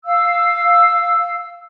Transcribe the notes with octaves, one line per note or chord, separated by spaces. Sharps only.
F5 E6